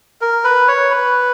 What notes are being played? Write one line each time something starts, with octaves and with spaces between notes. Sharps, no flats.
A#4
B4
C#5
B4